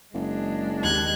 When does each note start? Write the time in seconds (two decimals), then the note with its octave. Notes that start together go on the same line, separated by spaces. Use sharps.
0.14 F#1 G#3 D4
0.83 D#2 F#6 G#6